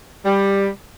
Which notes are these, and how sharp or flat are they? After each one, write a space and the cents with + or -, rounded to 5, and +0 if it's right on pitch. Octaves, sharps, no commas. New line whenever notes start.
G3 +10